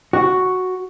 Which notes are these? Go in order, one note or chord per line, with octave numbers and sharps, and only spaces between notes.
F#4